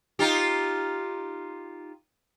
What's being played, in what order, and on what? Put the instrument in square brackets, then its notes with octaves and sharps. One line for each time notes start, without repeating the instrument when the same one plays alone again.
[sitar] D#4 F4 G4